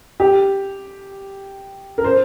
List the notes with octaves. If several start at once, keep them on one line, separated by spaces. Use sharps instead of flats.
G4
A#4
C5